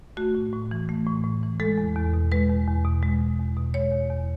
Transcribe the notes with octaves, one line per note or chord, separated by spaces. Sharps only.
A3 F#4
A2
A2
E3
A3
A2
A2
E3
G#3 A4
E2
E2
B2
G#3 B4
E2
E2
B2
G#3
E2
E2
B2
G#3 C#5
E2
E2